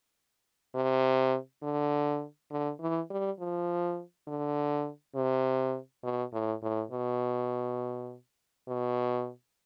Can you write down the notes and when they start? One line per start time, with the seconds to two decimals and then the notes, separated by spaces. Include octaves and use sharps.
0.75 C3
1.63 D3
2.51 D3
2.80 E3
3.10 G3
3.39 F3
4.27 D3
5.15 C3
6.03 B2
6.33 A2
6.62 A2
6.91 B2
8.68 B2